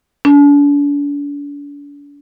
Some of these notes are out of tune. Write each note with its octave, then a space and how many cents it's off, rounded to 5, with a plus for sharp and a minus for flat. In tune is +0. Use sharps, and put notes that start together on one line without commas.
D4 -40